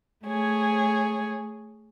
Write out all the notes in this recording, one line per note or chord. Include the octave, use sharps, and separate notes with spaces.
A3 G#4 C#5